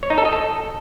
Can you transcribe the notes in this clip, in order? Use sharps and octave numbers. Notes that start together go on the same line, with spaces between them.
C#5
D#4
A4
D#5
A4